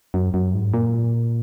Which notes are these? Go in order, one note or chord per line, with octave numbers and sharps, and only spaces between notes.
F#2
F#2
G#2
A#2